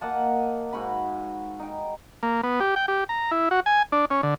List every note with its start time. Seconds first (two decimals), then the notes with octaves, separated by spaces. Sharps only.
0.01 A#3 D#5 F#5 A5
0.73 G#2 F#4 G#5 B5
1.59 D#4 G5
2.23 A#3
2.43 B3
2.60 G4
2.76 G5
2.88 G4
3.09 A#5
3.31 E4
3.51 F#4
3.66 G#5
3.92 D4
4.10 C#4
4.23 D3